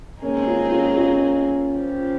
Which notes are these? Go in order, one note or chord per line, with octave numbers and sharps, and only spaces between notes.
D#3 G#3 A#3 C4 C#4 D#4 G#4
C#4 F4
C#4 F4
C#4 F4
C#3 F3 C4 G4